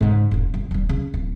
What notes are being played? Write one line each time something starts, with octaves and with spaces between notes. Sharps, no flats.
G#2 C#3
E1 A1
G1
D#1 G3
C#3 C#4
D1